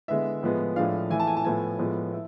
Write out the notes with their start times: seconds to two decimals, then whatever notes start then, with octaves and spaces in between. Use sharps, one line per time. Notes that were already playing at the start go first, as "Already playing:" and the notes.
0.08 D3 G#3 B3 E4 E5
0.43 A2 F3 G#3 B3
0.76 A2 F3 G#3 D4 F5
1.10 E3 A3 E4 G#5
1.20 A5
1.27 G#5
1.37 A5
1.44 A2 F3 B3 E4 G#5
1.79 A2 F3 G#3 B3
2.12 E4